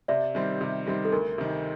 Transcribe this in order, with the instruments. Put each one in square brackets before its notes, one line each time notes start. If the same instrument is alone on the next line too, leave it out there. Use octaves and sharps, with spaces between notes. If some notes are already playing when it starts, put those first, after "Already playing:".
[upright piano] C3 [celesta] D5 E5
[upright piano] D#3 G3 C4
C3
D#3 G3 C4
[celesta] A4
[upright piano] D2 [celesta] A#4
[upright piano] C3 D#3